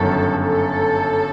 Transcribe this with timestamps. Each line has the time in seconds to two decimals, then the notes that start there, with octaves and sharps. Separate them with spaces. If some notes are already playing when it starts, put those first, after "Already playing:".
Already playing: G1 F#2 D#3 A4
0.41 A4